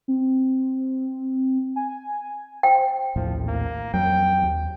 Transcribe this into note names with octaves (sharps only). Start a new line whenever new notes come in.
C4
G#5
C5 G5
A#1 D#2 A2 F3
A#3
F2 F#3 G5
D#2